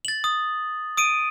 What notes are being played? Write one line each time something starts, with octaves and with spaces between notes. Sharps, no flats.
A6 F#7
D#6
D#6 D7 D#7